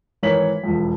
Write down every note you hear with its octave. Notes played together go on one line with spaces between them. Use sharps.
G#1 E3 A#4 C#5 B6 F#7
E1 F2